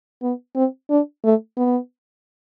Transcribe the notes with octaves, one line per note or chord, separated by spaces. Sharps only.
B3
C4
D4
A3
B3